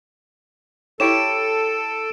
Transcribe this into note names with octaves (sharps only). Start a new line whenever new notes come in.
E4 G4 A4 C#5 D7 E7